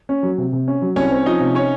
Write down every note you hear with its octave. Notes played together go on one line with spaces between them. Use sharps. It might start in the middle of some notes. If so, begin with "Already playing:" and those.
C#4
F#3
C3
C3
C#4
F#3
C2 C#4 C#5
C4
F3 D#4 D#5
C3
C#4 C#5